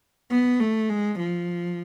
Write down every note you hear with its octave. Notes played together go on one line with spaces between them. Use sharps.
B3
A3
G#3
F3